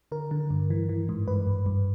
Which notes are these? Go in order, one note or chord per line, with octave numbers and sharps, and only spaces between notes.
D3 A#4
D3
G2
E3
E3
G#2
G2 B4
G2
G2